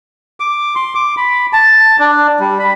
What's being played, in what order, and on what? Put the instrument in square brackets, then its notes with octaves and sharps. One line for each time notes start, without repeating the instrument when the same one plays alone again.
[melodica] D6
C6
D6
B5
A5
D4
G3
B5